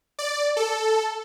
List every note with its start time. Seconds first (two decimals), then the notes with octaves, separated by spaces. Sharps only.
0.19 D5
0.57 A4